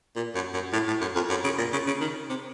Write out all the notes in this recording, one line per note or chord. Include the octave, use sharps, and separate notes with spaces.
A#2
F#2
F#2
A2
A2
F#2
F2
F#2
C#3
A#2
C#3
C#3
D#3
C3